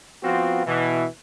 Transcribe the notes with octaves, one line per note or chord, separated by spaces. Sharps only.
F3 B3 C4 F4 F#4
B2 E3